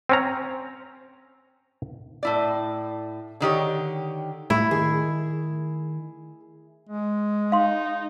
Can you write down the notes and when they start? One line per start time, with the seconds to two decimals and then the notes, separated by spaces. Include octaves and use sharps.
0.09 C4 C#4 A#5
2.23 A2 E4 D5
3.40 D3 D#3 G4 C#5
4.50 A2 A3 E4
4.71 D#3 G#4
6.89 G#3
7.52 D#4 F5 C6